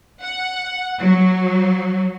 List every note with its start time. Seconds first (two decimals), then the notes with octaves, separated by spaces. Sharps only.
0.21 F#5
1.00 F#3